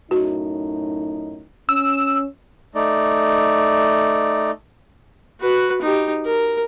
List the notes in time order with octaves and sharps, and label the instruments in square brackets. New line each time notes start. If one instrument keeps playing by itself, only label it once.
[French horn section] F#2 A2 D#4 [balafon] F#4
[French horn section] C#4 [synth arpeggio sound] E6
[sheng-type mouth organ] A3 D#4 D5
[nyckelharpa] F#4 B4
D#4 G4
A#4